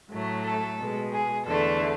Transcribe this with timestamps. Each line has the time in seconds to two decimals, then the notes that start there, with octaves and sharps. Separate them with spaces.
0.10 A2 F#3 A3
0.44 A4
0.79 B2 G#3
1.13 G#4
1.47 E2 D3 A3 A4